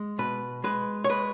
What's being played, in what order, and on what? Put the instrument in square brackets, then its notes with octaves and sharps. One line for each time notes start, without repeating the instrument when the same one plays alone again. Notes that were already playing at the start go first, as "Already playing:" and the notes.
Already playing: [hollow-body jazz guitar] G#3
B2 B4
G#3 B4
C#5
G#3 B4